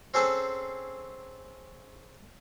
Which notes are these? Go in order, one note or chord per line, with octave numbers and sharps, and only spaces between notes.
C4 C#4 G#4 A4 B4 C5